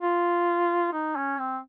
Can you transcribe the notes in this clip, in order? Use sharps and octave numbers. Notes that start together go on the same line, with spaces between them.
F4
D#4
C#4
C4